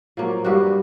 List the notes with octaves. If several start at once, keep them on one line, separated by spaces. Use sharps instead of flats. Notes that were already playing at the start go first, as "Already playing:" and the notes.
F3 F#3 A#3
G2 G3 A#3 F#4